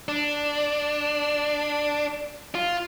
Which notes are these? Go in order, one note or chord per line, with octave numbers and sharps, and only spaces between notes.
D4
F4